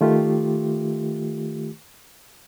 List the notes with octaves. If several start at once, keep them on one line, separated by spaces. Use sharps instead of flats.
D#3 A3 F4 G4